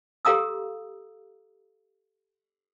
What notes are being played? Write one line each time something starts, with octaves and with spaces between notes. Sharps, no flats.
G4 A4 F5 A#5 D#6 E6